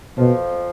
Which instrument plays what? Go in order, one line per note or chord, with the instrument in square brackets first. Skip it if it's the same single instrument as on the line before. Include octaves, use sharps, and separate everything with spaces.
[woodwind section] F2 F3 [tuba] B2